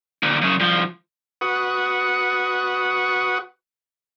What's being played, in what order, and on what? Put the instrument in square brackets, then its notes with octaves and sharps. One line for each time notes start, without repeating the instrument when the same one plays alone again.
[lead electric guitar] D2 A#2
F#2 C#3
C2 F3
[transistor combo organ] F#4 B4 F#5 C#6 D#6